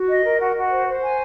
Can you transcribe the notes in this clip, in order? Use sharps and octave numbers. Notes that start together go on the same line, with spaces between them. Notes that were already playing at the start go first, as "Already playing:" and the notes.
Already playing: F#4
D#5
A#4
F#4
F#4
C5
C5
G#5